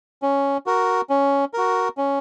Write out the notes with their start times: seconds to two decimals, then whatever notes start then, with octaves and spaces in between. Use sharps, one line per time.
0.22 C#4
0.66 F#4 A#4
1.10 C#4
1.54 F#4 A#4
1.98 C#4